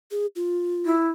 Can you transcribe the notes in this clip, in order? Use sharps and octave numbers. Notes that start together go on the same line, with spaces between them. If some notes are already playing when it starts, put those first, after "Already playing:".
G#4
F4
E4